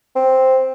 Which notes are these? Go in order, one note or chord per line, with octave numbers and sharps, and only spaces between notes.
C4